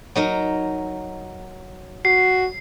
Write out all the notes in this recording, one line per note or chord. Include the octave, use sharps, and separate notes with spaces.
F#3 D#4 A#4
F#4 C7